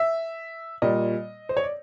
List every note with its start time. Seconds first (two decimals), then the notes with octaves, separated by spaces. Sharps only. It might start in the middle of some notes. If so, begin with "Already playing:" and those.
Already playing: E5
0.82 A#2 G3 D#5
1.49 C5
1.57 C#5
1.64 D5